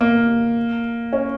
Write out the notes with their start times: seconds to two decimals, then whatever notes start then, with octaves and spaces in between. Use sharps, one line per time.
0.01 A#3
1.13 C#4